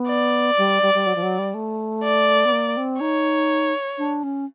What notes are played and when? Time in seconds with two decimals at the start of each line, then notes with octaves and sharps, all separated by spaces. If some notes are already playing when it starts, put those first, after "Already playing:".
Already playing: B3
0.08 D5
0.58 G3
0.82 G3
0.94 G3
1.06 F#3
1.16 F3
1.23 F#3
1.39 G3
1.54 A3
2.03 D5
2.45 B3
2.52 A#3
2.77 C4
3.01 D#4 C#5
3.98 D4
4.23 C#4